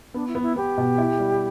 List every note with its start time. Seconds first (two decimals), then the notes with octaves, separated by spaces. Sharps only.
0.14 B3 D4
0.28 E4
0.35 B3
0.42 E4
0.56 B3 G4
0.78 B2
0.98 E4
1.19 G3